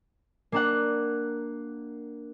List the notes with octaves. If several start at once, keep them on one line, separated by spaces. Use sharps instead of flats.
A#3 D4 F#5